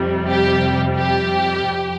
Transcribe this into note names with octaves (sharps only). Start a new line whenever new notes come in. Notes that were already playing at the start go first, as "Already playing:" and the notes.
Already playing: F2 C3 G3
G4
G4
F2